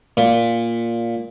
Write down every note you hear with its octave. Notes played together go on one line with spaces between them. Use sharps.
A#2